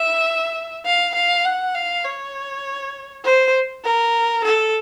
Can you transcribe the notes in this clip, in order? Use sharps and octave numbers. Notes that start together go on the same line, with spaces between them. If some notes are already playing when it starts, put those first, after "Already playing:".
Already playing: E5
F5
F5
F#5
F5
C#5
C5
A#4
A4